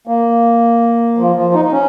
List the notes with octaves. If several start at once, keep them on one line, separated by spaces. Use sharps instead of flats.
A#3
F3
F3
D#4
D#4
C#4